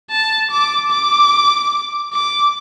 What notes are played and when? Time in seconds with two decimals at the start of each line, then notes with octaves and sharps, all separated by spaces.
0.11 A5
0.51 D6
0.91 D6
2.13 D6